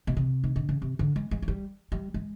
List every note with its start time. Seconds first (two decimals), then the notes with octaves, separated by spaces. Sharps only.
0.07 B2
0.17 C3
0.44 D#3
0.56 D3
0.69 C#3
0.82 C3
0.99 D3
1.16 G#3
1.31 G#3
1.42 F#3
1.48 G3
1.92 G3
2.14 G#3